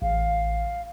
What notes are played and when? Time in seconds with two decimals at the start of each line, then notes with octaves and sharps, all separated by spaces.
0.02 A1 F5